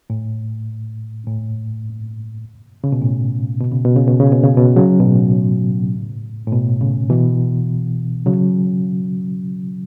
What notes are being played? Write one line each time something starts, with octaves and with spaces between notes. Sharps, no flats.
A2
A2
C#3
B2
A2
B2
C#3
B2
C#3
B2
C#3
B2
C#3
B2
C#3 F#3
B2
A2
A2
B2
A2 C#3
B2 E3
C#3 F#3